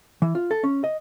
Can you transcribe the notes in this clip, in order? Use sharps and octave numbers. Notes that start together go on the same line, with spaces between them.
E3
F4
A4
C#4
D#5